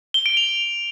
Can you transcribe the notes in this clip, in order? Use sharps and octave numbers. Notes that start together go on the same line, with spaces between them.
G7
D7
F7